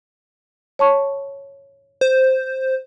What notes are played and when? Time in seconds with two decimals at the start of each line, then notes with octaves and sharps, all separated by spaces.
0.79 C#5 A5 C#6
2.01 C5